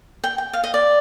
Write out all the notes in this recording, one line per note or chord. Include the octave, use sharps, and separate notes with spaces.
G5
G5
F5
D#5
D5